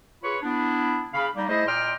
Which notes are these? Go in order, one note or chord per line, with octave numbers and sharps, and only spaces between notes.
F4 G#4 B4 C#5 B5 C#6
B3 D4 E4
C#3 F5 B5
G3 A#3 D#4
A3 E4 G#4 C5 D#5
A#2 D5 D#5 G5 C6 F6